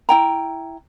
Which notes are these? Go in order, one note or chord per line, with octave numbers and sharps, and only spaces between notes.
E4 G5 A#5